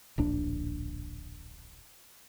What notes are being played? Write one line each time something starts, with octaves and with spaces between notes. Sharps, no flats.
D1 A#1 D4